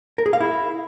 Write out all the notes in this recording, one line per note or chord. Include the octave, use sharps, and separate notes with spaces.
A#4
G#4
F5
E4